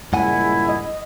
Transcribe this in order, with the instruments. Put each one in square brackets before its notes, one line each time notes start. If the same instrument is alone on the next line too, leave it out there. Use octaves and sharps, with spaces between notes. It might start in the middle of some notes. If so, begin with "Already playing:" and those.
[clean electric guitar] G2 F#5 G#5 [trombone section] A#2 C#3 G#3 [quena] E4
[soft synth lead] D#5